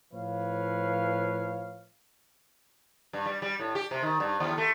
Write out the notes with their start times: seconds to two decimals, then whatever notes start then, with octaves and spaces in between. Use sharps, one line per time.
0.13 A2 F3 B4 C#5 F5
3.13 G2
3.26 G3
3.42 G3
3.60 A2
3.75 G4
3.91 C3
4.02 D#3
4.20 G2
4.40 D#2
4.58 A3